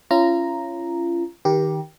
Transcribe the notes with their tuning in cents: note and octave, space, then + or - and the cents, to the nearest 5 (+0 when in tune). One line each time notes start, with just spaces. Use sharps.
C#4 +0 F4 -35 A#5 +0
D#3 +0 G4 +0 A#4 +40